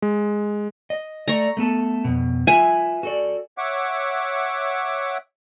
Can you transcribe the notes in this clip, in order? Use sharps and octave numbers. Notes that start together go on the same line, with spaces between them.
G#3
D#5
A3 D5 A#5 C#6
A3 B3 A4
F2 B2
F4 B4 E5 G#5
F#4 A4 D5
C#5 E5 F#5 D6